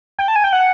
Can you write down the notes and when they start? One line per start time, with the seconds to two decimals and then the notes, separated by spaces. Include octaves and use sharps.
0.19 G5
0.28 A5
0.36 G#5
0.44 G5
0.53 F#5